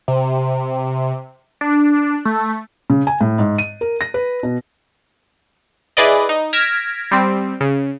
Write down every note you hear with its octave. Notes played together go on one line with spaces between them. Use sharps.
C3
D4
A3
C#3
G#5
A2
G#2
D#7
A#4
A#6
B4
B2
E4 G#4 B4 D5 D#5
D#4
F6 G#6 A#6 B6 D7 E7
G3 C4
C#3